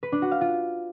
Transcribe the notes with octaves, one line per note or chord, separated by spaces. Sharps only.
B4
D4
F#4
F5
F4